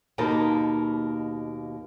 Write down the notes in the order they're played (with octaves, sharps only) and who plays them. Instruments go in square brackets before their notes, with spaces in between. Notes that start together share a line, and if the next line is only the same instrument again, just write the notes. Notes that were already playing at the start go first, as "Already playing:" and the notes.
[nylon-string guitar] D#2 B2 A#3 D#5 A5